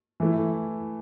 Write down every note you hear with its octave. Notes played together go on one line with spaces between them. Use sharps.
E3 A3 E4